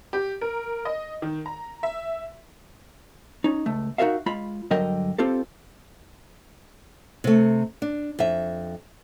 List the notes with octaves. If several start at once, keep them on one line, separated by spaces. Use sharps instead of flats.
G4
A#4
D#5
D#3
A#5
E5
C#4 D#4
C#2 A3
D#4 F#4 A4 A#4 E5 F5
G#3 F4 B5
G2 D3 F#3 A#4 D#5 G5
C4 F4 G4 A4
C3 A3
D4
F2 E5